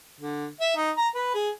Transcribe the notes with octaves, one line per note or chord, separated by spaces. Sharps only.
D3
E5
D#4
A#5
B4
G#4